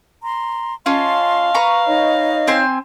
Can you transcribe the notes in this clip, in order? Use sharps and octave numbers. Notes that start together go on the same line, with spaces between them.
A#5 C6
C#4 F4 D#5 F5 A5 C6
B4 A#5 C#6
D#4 C#5 D#5
C4 G#5 C6